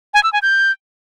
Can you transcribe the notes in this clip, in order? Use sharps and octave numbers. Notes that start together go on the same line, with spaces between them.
G#5
E6
G#5
G6